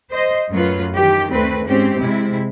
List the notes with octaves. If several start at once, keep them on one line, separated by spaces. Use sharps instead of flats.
C5 D#5
F#2 A2 F#3 F4 B4
D#3 E3 G4
D2 A3 C4 B4
G#2 C4 C#4 G4
C3 G#3 E4